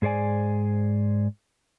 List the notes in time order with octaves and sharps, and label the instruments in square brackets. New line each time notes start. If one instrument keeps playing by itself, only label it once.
[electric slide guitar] G#2 G#4 C5 D5 G#5